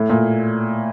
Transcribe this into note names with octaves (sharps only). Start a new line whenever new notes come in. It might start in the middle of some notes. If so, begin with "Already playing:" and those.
Already playing: A2
A#2